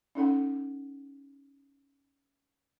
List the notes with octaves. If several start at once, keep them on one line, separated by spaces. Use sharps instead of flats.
C#4 D#4 A4 F#5